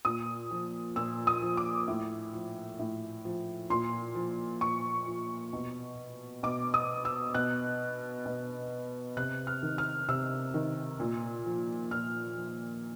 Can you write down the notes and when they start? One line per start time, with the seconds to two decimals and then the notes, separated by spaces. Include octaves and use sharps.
0.05 A#2 D#6
0.51 F3
0.96 A#2 E6
1.27 D#6
1.42 F3
1.57 D6
1.88 A2
2.33 F3
2.79 A2
3.25 F3
3.70 A#2 C6
4.15 F3
4.61 A#2 C#6
5.06 F3
5.53 B2
6.43 B2 D6
6.74 D#6
7.05 E6
7.35 B2 F#6
8.26 B2
9.17 C3 F#6
9.47 F6
9.63 D#3
9.78 F6
10.08 C3 E6
10.54 D#3
11.00 A#2
11.46 F3
11.91 A#2 F6
12.36 F3